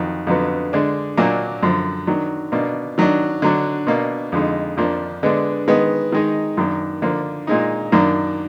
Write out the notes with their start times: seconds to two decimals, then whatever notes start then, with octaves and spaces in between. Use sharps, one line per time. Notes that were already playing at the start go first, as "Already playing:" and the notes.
Already playing: F2 D#3 F#3
0.27 F2 D3 F#3 B3
0.73 D3 G#3 D4
1.17 A#2 F#3 A#3 D4
1.62 F#2 D3 F3
2.07 D#3 F#3 D4
2.52 B2 A#3 D4
2.98 D#3 F#3 D4
3.42 D3 F#3 D4
3.87 B2 A#3 D4
4.32 F2 D3 G#3 D#4
4.77 F2 F3 A#3 D4
5.23 D3 G#3 B3 D4
5.68 D#3 G#3 B3
6.12 D#3 G#3 D#4
6.57 F#2 D#3 A#3 D4
7.02 D3 F3 A#3 D4
7.47 A#2 G#3 D#4
7.92 F#2 D#3 A#3 D4